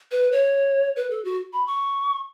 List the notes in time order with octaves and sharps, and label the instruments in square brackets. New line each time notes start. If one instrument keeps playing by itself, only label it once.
[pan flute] B4
C#5
B4
A4
F#4
B5
C#6